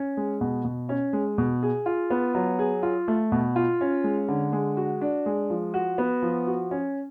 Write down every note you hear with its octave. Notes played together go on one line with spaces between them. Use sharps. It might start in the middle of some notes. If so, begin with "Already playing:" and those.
Already playing: C#4
G#3
B2
B2
C#4
G#3
B2
G#4
F4
B3
F#3
G#4
F4
A3
B2
F4
C#4
G#3
D3
G#3
F#4
D4
G#3
F3
F#4
B3
F3
F#4
C#4